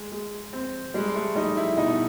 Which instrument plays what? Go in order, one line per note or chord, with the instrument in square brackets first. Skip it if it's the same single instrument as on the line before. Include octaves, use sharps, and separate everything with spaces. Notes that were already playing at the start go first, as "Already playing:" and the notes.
Already playing: [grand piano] G#3
G#3
C4
[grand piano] G3 [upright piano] G#3
[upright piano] A3
[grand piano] G3 [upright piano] D#4
[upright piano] E4
[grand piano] B2 [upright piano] D#4